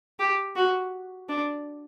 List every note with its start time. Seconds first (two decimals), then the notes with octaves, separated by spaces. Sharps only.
0.20 G4
0.56 F#4
1.29 D4